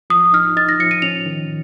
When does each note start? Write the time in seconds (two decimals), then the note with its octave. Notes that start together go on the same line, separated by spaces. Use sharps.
0.10 F3 D#6
0.33 D#4 F6
0.56 D#4 A6
0.69 A#6
0.79 F3 C#7
0.91 D#7
1.02 C#4 F7
1.26 D#3